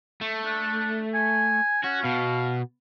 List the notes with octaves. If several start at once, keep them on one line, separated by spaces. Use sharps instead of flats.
A3
D4
G#5
C#4 F#4
B2 F5